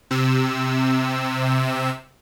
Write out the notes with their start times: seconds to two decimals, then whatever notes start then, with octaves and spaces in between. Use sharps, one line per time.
0.11 C3 E6